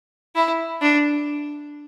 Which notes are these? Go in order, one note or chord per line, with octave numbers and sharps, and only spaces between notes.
E4
D4